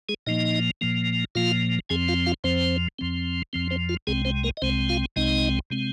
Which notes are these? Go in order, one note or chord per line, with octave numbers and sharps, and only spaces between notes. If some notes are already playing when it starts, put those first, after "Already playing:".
G#3 G#4
A#2 F3 A#3 D#4 D#5
A#2 F3 A#3
A#2 F3 A#3 F4 F5
F2 F3 C4 G#4 G#5
F4 F5
F4 F5
F2 F3 C4 C5
F2 F3 C4
F2 F3 C4
C4 C5
F4
C2 C3 G#3 C4 G#4
C4 C5
A#3 A#4
D#5
C2 C3 G#3 C4 C5
F4 F5
C2 C3 G#3 C4 D#4 D#5
C3 G#3 C4